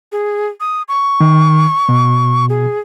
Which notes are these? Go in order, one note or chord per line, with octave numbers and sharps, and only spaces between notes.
G#4
D#6
C#6
D#3
B2
G#4